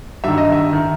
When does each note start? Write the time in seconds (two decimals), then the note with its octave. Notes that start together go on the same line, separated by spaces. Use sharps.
0.24 G2 D#3 E5
0.38 D#5
0.52 E5
0.73 D#3